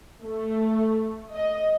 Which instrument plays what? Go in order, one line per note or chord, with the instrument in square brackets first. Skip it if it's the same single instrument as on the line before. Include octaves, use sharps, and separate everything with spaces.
[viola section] A3
D#5